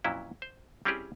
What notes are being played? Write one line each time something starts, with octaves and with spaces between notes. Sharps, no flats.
F2 A#2 F#3 C#4 E4
C5
G3 C4 C#4 E4 G4 G#4